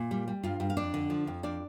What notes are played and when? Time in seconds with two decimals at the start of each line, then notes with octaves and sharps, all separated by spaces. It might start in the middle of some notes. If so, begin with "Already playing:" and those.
Already playing: A#2
0.11 G3
0.28 G3
0.43 G2 F4 F5
0.60 G2
0.70 F5
0.77 F2 D4 D5
0.94 D3
1.10 F3
1.27 F2
1.43 F3 D4 D5